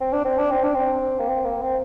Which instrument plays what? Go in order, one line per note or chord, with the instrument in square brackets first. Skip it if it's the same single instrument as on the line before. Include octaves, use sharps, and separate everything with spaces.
[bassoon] C4
D4
C4
D4
C4
D4
C4
A#3
C4
A#3
C4